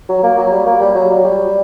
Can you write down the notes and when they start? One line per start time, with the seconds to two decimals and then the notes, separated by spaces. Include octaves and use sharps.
0.09 F#3
0.23 A#3
0.37 F#3
0.52 G3
0.66 A#3
0.81 G3
0.95 F#3
1.10 F#3
1.24 G3